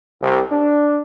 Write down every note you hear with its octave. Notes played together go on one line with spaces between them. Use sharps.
C2
D4